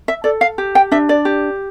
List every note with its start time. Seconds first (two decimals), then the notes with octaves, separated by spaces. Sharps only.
0.08 E5
0.24 A4 D5
0.41 F5
0.58 G4
0.75 G5
0.91 D4 E5
1.09 D5
1.25 G4